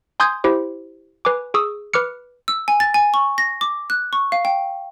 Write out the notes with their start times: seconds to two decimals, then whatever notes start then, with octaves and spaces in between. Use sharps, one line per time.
0.20 G#5 C6 D#6 G6 G#6
0.44 E4 G4 C5
1.25 B4 G#5 D6
1.54 G#4 C#6 D#6 E6
1.94 B4 D6 F6 C#7
2.48 E6
2.68 G#5
2.80 A6
2.94 G#5
3.14 C#6
3.38 A#6
3.61 D6
3.90 F#6
4.13 C#6
4.32 F5
4.45 G5